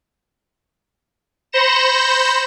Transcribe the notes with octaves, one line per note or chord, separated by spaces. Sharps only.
C5 B5 G6 A#6 C#7 E7